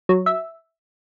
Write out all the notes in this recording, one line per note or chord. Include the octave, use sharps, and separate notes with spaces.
F#3
E5